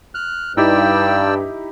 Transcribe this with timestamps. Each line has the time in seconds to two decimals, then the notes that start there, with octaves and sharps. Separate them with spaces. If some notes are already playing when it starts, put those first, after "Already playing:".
0.15 F6 F#6
0.57 G2 D#4 E4 G4 D5 G5 E6